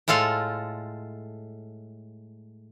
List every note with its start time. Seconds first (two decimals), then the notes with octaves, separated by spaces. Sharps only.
0.08 A2 G#3 F4 A4 F5